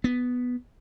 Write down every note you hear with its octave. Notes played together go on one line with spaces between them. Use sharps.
B3